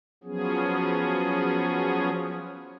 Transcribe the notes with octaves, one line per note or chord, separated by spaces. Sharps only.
F3 F#3 B3 C#4 G#4